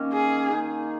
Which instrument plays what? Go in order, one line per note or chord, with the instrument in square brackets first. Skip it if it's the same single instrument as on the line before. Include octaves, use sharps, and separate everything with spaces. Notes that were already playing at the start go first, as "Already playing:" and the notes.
Already playing: [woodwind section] D#3 A#3 C#4
[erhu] G#4
[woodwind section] D#3 A#3 D#4